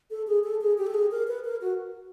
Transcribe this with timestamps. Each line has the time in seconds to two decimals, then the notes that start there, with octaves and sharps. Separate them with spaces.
0.10 A4
0.27 G#4
0.44 A4
0.61 G#4
0.78 G4
0.87 A4
0.94 G#4
1.11 A#4
1.27 B4
1.44 A#4
1.61 F#4